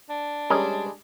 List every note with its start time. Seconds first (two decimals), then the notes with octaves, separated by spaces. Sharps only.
0.10 D4
0.50 G3 G#3 C#4 A#4 D#5